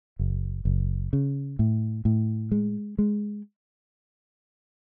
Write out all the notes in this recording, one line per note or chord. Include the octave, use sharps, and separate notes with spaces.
F#1
F#1
C#3
A2
A2
G#3
G#3